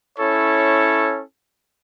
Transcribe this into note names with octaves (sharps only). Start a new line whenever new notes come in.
C#4 E4 A4 C#5